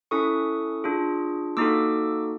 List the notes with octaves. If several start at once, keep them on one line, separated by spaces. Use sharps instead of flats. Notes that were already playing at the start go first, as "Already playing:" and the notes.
C#4 E4 A4 C#6 D#6
D4 F4 G#4
A#3 D#4 F#4 A4 D6 E6